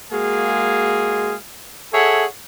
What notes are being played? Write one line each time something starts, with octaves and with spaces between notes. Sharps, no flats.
G#3 A#3 F#4 G#4 F5
G#4 A4 C#5 E5 F#5